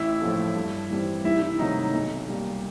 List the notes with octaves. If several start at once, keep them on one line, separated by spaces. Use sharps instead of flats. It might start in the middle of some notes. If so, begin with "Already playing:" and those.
Already playing: A1 E4 E5
A2 F3 A3
G2
E3 G3 C4
C2 E4 E5
E4 E5
C3 D#3 F#3 A3 D#4 D#5
B1
A#2 G3